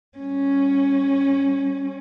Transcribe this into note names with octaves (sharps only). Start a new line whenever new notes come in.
G3 C#4